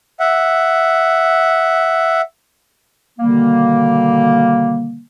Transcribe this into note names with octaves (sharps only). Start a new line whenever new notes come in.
E5 F#5
B2 D3 D#3 G3 A#3